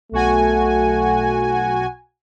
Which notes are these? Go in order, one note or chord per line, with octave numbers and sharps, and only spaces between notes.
B1 A3 F#4 G#5